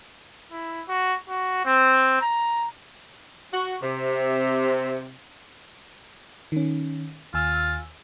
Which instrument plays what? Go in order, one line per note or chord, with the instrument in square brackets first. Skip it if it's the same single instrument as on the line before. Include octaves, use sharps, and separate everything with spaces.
[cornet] E4
F#4
F#4
C4
A#5
[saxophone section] F#4
C3
[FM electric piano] D#3 C#4
[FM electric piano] D#2 G#5 E6 [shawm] F4